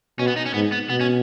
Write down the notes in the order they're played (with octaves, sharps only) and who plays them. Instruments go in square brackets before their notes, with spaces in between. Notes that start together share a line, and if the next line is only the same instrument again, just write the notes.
[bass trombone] B2 [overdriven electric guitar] C#4
[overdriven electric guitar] B3
D#4
C#4
[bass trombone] G#2 [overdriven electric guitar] B3
[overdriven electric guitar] B3
[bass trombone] B2 [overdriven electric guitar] B3
[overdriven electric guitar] C#4